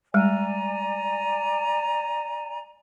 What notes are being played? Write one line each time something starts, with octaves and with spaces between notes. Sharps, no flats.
G3 G#3 D5 G#5 A#5